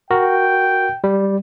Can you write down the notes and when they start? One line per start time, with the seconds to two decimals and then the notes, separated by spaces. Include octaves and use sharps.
0.11 F#4 A#4 G5
1.04 G3